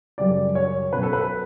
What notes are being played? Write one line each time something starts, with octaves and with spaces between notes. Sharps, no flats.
F#2 C#3 G3 D5
C#5
B2 F#3 C#4 B4
A4
B4